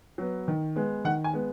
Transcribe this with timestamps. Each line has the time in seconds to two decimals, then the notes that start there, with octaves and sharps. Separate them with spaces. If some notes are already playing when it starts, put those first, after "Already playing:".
0.18 F#3 B3
0.48 D#3
0.76 G#3 B3
1.05 D#3 F#5
1.24 G#5
1.33 G#3 B3